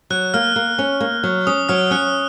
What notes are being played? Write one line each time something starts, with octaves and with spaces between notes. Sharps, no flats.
F#3 F#6
A#3 F6
A#3
C#4
A#3
F#3
C#4 D#6
F#3 F6
C#4 F#6